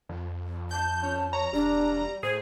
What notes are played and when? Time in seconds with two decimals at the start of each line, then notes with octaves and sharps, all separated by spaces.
0.09 F2
0.71 A5 G6
1.03 C#4
1.33 C#5 A#5
1.53 E1 G3 D4
2.23 A2 G#4 C5